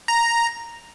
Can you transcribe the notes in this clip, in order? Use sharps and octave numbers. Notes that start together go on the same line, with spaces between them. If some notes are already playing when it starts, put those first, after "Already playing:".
A#5